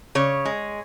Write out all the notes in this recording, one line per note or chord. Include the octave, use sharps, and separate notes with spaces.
C#3 C#5
G#3